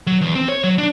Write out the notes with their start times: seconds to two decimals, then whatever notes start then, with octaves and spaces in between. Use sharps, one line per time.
0.07 F#3
0.21 E2
0.35 C4
0.49 C#5
0.64 F#3
0.78 D4